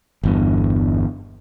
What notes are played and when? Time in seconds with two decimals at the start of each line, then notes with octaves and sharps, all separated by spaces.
0.23 G1 E2 G2